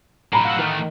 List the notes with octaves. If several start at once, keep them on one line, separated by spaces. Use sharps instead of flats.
A2 F#3 A#5 B5
F5 F#5 E6
D#3 E3 A3